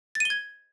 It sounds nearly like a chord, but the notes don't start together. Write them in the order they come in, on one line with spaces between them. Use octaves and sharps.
A6 D#7 G7 G#6